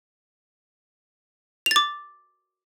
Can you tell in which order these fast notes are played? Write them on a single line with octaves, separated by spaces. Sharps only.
F7 A6 D6